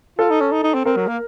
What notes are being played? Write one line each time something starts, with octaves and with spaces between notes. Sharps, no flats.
F4 A4
D#4
C#4
D#4
D#4
C4
C4 A#4
F#3
A#3